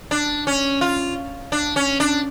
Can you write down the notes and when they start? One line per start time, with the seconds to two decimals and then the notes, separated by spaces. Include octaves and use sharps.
0.11 D4
0.47 C#4
0.81 F4
1.52 D4
1.76 C#4
2.00 D4